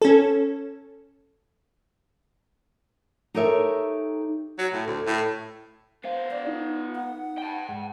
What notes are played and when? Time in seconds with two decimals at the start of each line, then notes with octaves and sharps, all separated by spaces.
0.02 C#4 A4
3.34 D#4 G4 A4 A#4 C#5 E5
4.58 F#3
4.73 A2
4.86 D2
5.06 A2
6.04 B3 C5 F5
6.31 D5
6.47 D#4 F4
6.96 F#5
7.38 G5 A5
7.68 G#2